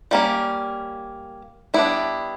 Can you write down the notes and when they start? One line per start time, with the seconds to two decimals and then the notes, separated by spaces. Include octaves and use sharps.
0.11 G3 A#3 C#4
1.74 G3 B3 D4 E4